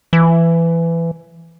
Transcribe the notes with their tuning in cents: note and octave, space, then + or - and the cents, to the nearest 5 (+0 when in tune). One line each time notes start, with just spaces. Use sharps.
E3 +20